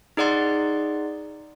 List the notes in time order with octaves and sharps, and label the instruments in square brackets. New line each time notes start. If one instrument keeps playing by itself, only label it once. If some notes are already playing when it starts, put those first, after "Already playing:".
[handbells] D#4 G#4 D5 F#5 C6